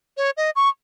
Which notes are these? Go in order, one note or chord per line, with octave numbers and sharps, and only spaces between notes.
C#5
D#5
C#6